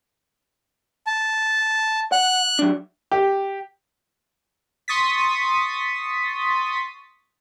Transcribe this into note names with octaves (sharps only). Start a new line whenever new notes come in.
A5
F#5 F#6
F#3 D4
G4
C6 C#6 D#6 A6 B6